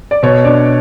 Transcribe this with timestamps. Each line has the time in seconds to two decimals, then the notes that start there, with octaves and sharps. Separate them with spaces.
0.11 D5
0.23 B2 C#5
0.44 D4 D5